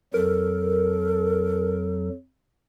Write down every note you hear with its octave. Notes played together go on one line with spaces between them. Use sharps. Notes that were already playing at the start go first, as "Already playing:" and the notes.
F2 F#3 A4 A#4